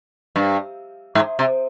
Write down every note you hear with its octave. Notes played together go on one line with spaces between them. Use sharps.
G2
G#2
C3